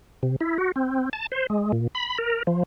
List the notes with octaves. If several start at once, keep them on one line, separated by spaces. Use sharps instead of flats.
C3
E4
F#4
C4
A5
C5
G#3
A#2
B5
A#4
F3